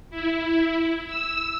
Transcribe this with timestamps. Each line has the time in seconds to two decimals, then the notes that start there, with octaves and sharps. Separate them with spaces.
0.10 E4
1.07 E6